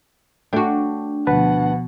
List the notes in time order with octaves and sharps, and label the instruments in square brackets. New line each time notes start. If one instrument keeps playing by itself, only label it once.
[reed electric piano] A3 G5 [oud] D4 F#4
[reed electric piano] D2 B4 A5 [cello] B2 F3 [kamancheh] F#5